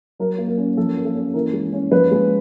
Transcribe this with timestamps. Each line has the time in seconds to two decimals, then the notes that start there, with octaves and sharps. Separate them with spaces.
0.19 F#3 A#4
0.38 A#3
0.48 A#4
0.58 C#4
0.77 F3 A4
0.97 A#3
1.05 A4
1.15 C#4
1.34 E3 A#4
1.53 G#3
1.73 C#4
1.92 F3 B4
2.11 G#3